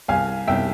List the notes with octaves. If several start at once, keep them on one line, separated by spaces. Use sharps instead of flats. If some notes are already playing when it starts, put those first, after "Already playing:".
C2 F5 G#5
C2 E5 G5